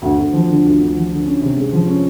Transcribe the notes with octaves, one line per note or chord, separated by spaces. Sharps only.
D2
D2
F3
D3
D2
D2
F3
D3
C#4
C3
G#3
F3
C#4